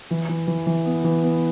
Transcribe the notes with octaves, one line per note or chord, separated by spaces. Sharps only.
E3
E3
E3
E3
B3
E3
B3